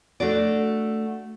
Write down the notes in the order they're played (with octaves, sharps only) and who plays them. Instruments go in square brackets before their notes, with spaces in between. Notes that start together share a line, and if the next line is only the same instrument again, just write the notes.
[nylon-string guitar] A3 D4 F#4 D5